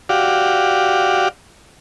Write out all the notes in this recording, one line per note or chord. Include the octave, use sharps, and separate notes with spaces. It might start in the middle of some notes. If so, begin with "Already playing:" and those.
F#4 G4 D5 F5